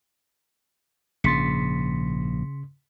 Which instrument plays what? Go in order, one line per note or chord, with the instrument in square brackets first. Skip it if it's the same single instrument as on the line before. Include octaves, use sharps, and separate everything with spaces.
[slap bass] A#1 G#2 [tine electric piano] C#3 A6 [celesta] C6 B6 C#7